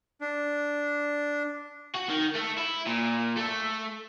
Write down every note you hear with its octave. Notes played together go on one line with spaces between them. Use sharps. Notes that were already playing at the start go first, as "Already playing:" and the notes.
D4
F#4
D#3
A3
E4
A#2
A3